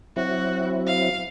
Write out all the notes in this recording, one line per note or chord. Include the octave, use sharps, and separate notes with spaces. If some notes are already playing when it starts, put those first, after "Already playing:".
F#3 C4 E4 F#4
F5